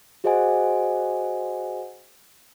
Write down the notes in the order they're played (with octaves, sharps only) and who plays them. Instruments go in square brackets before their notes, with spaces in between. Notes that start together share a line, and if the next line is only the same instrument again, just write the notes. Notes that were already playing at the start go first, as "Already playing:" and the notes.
[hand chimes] F#4 G#4 C5 D#5 F#5 G#5